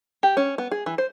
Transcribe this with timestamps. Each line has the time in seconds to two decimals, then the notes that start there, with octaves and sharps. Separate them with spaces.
0.23 G4
0.37 C#4
0.58 B3
0.71 G#4
0.86 E3
0.98 C5